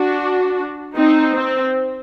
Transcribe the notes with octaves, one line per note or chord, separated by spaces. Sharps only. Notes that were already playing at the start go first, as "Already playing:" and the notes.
Already playing: D4 F#4
C4 D#4
C4